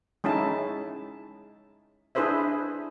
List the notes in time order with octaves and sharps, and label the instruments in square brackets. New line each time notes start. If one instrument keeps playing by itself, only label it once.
[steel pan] G#3 C#4 D#4 E4 A5
D4 E4 G#4 B4 C5 E5